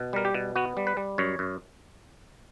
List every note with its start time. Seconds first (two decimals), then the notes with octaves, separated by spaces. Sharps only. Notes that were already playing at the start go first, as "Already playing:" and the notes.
Already playing: B2
0.13 G3 A#4
0.25 G4
0.34 B2
0.55 B3 F#4
0.77 G3
0.87 B4
0.97 G3
1.18 F#2 C#5
1.39 F#2